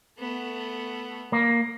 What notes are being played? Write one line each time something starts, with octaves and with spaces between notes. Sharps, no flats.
A3 B3
A#3